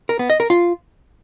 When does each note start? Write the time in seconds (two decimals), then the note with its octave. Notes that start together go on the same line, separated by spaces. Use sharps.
0.09 A#4
0.19 B3
0.30 D#5
0.40 A#4
0.50 F4